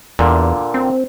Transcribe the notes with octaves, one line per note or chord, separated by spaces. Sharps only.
E2 A#2 D3
C4